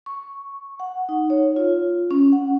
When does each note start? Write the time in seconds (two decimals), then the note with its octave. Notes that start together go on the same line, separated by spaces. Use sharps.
0.06 C#6
0.80 F#5
1.09 D#4
1.30 C#5
1.56 F4
2.11 C#4
2.32 F#5